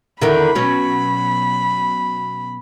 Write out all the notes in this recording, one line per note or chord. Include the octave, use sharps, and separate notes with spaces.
E2 D3 D#3 B5
B2 F#3 C#4